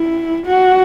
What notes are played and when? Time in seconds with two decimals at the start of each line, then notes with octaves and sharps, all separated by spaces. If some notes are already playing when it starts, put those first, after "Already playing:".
Already playing: E4
0.47 F#4